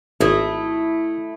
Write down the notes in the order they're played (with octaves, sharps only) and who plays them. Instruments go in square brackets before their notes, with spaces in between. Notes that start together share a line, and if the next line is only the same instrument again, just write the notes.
[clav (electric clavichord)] G#1 [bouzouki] A3 E4 D#5